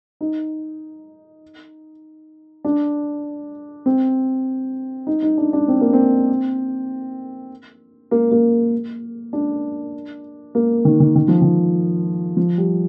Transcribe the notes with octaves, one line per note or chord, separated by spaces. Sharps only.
D#4
D4
C4
D#4
D#4
D4
D4
C4
A#3
C4
A#3
A#3
D4
A#3
D#3
D#3
D#3
F3
D#3
F3
G3